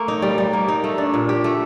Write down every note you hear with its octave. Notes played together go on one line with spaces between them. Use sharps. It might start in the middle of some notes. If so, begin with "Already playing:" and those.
Already playing: A3 A#3
D#4
G3
G3
A#3
D#4
A3
D4
A#2
G4
A3